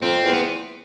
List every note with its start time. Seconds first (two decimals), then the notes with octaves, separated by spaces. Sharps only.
0.02 F2 C4
0.23 E2
0.33 B3